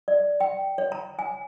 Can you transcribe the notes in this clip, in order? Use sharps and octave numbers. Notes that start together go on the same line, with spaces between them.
D5
G5
C#5
A#5
G#5